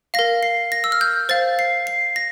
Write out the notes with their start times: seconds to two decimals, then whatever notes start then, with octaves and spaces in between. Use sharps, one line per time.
0.14 F5 A#6
0.19 A#4
0.43 C7
0.72 A#6
0.84 E6
0.92 F6
1.01 G6
1.29 C5 F5 A6
1.59 C7
1.87 C7
2.16 A#6